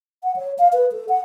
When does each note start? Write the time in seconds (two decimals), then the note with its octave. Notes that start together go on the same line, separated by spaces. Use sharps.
0.24 F#5
0.36 C#5
0.58 F5
0.73 B4
0.92 A4
1.09 F#5